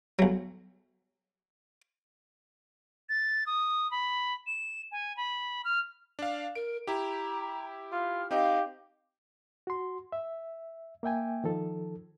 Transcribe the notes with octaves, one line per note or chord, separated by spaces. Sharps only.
B1 F#3
A6
D#6
B5
E7
G#5
B5
F6
D4 F5
A#4 D7
E4 G4 A#5
F4 F6
C4 D#4 G4 D#5 F5
F#4 C6
E5
A#3 E5 G5 G#5
D#3 F3 A4